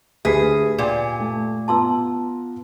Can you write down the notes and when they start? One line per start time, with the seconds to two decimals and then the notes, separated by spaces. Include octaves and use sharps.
0.25 D2 G4 G#4 B4 E5 B5 B6
0.78 A#2 D5 G5 G#5
1.20 A3
1.68 B3 F4 A5 A#5 C6 E6